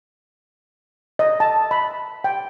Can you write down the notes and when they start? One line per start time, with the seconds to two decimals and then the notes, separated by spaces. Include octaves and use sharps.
1.19 D#5
1.40 A5
1.71 B5
2.24 G5